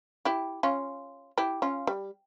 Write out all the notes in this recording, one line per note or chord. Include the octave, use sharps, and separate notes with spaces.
E4 G4
C#4 F4
E4 G4
C#4 F4
G3